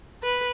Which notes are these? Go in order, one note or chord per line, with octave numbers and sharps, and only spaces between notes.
B4